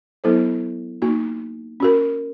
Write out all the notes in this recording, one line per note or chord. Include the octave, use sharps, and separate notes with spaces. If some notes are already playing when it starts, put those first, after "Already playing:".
F#3 B3 E4 A4 C5
A#3 D#4 F#4
C#4 F#4 A#4